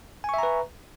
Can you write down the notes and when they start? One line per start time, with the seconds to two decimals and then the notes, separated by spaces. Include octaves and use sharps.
0.24 G#5
0.29 C#6
0.34 E5
0.38 A#5
0.43 B4